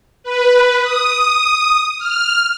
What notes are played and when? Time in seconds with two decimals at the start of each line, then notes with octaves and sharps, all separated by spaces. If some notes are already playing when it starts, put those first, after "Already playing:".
0.23 B4
0.81 D#6
1.99 F6